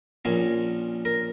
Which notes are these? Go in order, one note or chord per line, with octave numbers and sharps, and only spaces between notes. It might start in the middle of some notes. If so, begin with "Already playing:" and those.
A#1 A#2 A#3 C#4
A#4